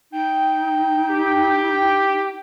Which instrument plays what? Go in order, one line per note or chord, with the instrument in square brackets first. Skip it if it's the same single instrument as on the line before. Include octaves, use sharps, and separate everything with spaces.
[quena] D#4 [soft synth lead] G5
[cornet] G4